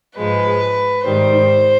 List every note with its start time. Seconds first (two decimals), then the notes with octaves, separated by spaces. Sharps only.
0.16 G#2 F3 G#3 B4
1.05 G#2 D#3 G3 C5